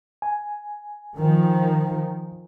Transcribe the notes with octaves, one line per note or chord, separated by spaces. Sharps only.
G#5
D#3 F3